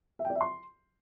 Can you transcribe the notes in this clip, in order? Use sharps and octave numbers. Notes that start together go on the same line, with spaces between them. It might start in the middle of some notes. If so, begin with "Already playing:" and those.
E5
G5
D5
E5
C6